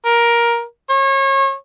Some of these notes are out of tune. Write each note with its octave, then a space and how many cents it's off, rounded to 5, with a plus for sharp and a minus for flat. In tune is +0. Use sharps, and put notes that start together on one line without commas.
A#4 +15
C#5 -30